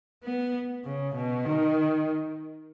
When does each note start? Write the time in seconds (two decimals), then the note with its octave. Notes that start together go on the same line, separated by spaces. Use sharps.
0.23 B3
0.85 C#3
1.15 B2
1.45 D#3